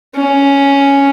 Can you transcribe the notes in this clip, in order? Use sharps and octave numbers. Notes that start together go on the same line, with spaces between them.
C#4